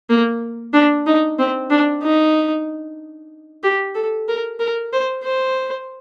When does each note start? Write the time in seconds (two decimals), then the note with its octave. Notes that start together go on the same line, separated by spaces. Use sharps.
0.10 A#3
0.73 D4
1.07 D#4
1.39 C4
1.70 D4
2.02 D#4
3.64 G4
3.95 A4
4.29 A#4
4.60 A#4
4.93 C5
5.24 C5